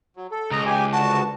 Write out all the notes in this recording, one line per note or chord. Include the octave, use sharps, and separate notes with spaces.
F#3
A4
C#2 D#5 A#5
G4 G#5
D2 F#4 A5